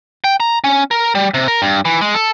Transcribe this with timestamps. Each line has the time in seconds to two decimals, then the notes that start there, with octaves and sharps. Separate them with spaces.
0.24 G5
0.40 A#5
0.64 C#4
0.91 A#4
1.15 G3
1.34 C3
1.48 A#4
1.62 G2
1.85 E3
2.01 G#3
2.14 A4